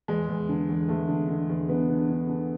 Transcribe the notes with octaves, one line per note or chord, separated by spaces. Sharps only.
E2 G#3
E2
D3
E2
E2 A3
D3
D3
E2
D3 B3
D3
D3
D3